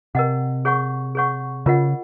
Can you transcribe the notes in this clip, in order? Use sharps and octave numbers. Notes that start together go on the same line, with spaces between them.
C3 A#4 D#5 F#5
G#4 C#5 F#5 C#6
G#4 C#5 F#5 C#6
C#3 F4 A#4 D#5 F#5